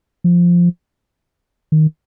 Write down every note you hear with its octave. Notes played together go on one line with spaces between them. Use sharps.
F3
D#3